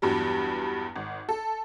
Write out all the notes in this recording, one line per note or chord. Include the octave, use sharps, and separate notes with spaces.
E2 G2 F#3 G3
G#1
A4